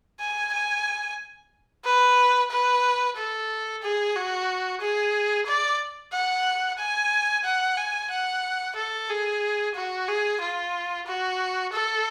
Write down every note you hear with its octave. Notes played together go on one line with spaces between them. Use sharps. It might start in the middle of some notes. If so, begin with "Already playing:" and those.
G#5
G#5
B4
B4
A4
G#4
F#4
G#4
D5
F#5
G#5
F#5
G#5
F#5
A4
G#4
F#4
G#4
F4
F#4
A4